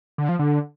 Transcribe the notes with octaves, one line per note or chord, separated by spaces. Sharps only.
D3
F3
D3